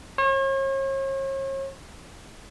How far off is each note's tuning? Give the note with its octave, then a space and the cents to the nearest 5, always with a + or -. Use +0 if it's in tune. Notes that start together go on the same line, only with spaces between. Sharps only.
C#5 -40